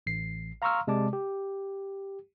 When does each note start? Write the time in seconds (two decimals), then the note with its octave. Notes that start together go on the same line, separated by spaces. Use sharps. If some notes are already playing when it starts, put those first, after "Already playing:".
0.07 A1 C7
0.62 F5 A#5 C6 C#6 E6 F6
0.87 C3 G#3 D5 A5 D6
1.13 G4